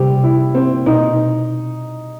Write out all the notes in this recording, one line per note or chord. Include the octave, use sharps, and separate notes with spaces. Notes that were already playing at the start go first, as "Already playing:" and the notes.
Already playing: C3 G3 G4
E4
C4
B2 D#4